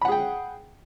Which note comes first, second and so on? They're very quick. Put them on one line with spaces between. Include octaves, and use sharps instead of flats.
B5 F#5 G#4 G5